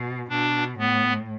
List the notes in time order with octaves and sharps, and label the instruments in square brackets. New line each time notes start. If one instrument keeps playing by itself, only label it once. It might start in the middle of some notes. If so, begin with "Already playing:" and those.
Already playing: [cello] B2
[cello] B2 [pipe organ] D4
[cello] A2 [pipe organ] B3